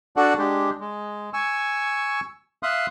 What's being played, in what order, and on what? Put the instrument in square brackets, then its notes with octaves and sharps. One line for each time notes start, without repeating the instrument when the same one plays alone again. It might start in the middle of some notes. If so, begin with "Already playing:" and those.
[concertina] D4 F#4 A4 D5 F#5
G#3 D4 G4
G#3
G#5 C#6 E6
E5 F5 C6 D#6 F#6